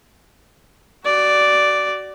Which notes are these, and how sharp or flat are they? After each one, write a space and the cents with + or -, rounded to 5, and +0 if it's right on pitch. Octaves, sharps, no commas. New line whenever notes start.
F#4 +30 D5 +0